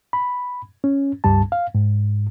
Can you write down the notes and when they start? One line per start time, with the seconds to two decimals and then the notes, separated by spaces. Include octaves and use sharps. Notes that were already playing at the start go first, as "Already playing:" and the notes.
0.13 B5
0.84 C#4
1.24 C#2 G2 G3 A5
1.52 F5
1.75 G#2